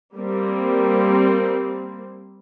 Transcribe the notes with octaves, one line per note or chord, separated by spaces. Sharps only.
G3 A#3 C4